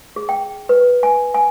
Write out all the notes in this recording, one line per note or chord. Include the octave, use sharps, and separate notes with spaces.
G#4
G5
B4
G#5
G#5